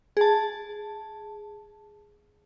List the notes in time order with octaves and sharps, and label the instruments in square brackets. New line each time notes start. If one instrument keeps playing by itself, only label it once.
[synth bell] G#4 A5